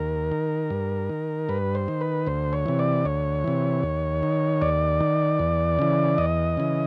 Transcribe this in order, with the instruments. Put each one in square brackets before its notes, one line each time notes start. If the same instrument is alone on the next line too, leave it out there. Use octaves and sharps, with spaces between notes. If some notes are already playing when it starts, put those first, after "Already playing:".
Already playing: [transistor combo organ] D#2 A#4
D#3
G2
D#3
G2 B4
C5
D#3
B4
D2 C5
C#5
C3 E3
D5
D2 C#5
C3 E3
D#2
D#3
D#2 D5
D#3
E2
C#3 E3
E2 D#5
C#3 E3